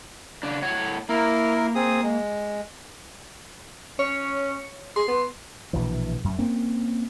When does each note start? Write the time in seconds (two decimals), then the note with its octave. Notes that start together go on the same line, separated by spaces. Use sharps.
0.43 C#3 D4
0.62 A2 C#5 F#5
1.09 A#3 E4 A#4
1.75 C4 G#4 D#6
2.03 G#3
3.99 C#4 C#5
4.96 G#4 C6
5.08 B3
5.73 A#1 B2 E3
6.24 F#2
6.39 A#3 C4 C#4